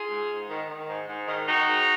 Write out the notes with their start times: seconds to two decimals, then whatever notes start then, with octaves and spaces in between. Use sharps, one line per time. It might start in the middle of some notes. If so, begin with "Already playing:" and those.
Already playing: F4 G#4
0.10 G#2
0.30 G#2
0.49 D#3
0.69 D#3
0.89 G#2
1.08 G#2
1.28 D#3
1.48 D#3 D#4 F#4
1.68 G#2